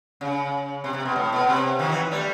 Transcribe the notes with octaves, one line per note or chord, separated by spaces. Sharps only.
C#3
C3
C3
B2
A2
B2
C3
D#3 F3
E3 F#3
G3 A3